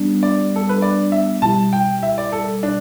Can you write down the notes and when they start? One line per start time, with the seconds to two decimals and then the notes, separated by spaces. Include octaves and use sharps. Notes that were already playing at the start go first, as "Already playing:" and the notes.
Already playing: G3 B3 D4
0.23 D5
0.56 A4
0.69 B4
0.82 D5
1.12 E5
1.42 B2 G3 E4 A5
1.73 G5
2.03 E5
2.18 D5
2.32 A4
2.63 D4